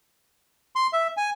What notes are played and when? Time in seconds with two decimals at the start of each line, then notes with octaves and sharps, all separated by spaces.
0.76 C6
0.93 E5
1.17 G#5